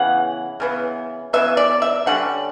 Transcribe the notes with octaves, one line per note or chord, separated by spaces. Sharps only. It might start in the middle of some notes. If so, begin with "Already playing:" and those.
Already playing: C#3 E3 B3 F#5
C#3 E3 B3
C#3 E3 B3 E5
D5
E5
D3 G3 C#4 F#5